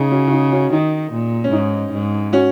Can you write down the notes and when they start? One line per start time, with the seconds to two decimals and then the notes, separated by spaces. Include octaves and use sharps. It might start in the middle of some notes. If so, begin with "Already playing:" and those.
Already playing: C#3 D#4 G#4
0.11 C#4 F#4
0.27 F#4
0.32 D#4
0.52 C#4 F#4
0.72 D#3 D#4
1.12 A#2
1.44 C#4
1.52 G#2 D#4
1.93 G#2
2.33 C#4 F#4